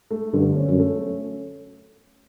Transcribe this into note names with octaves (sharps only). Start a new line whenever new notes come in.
A3
G2 D3
C#4
F#2
A3
C#4